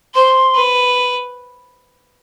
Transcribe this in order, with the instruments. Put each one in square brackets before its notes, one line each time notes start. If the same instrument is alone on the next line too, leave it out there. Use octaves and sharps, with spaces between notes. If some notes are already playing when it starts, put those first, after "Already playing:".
[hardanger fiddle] C5 [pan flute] C6
[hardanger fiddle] B4